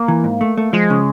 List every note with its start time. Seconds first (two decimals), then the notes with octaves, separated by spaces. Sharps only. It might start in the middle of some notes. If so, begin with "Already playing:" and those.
Already playing: A#3
0.08 E3
0.24 G#2
0.41 A3
0.57 A3
0.73 F3 G#3
0.90 C#3